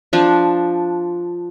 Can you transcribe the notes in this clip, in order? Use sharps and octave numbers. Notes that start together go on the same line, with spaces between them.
F3 D4